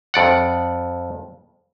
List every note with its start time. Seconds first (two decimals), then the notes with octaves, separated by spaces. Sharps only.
0.14 F2 D5 F#5